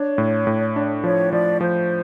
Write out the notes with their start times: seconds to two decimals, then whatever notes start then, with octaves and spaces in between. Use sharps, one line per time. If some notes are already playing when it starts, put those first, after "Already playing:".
Already playing: D4 C#5
0.18 A2
0.47 A2
0.76 D4
1.04 F3 C#5
1.32 F3 D5
1.61 F3 C5